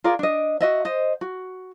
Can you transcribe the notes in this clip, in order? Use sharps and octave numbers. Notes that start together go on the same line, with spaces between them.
F4 G#4 A#4 D5
D4 D#5
F#4 D#5 E5
C5 D#5
F#4